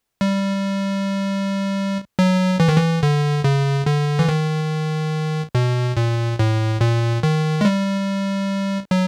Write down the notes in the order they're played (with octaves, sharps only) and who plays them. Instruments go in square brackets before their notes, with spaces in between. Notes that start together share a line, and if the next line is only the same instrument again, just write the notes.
[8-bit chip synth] G3
F#3
E3
D#3
E3
D3
C#3
D3
E3
D#3
B2
A#2
A2
A#2
D#3
G#3
G3
F#3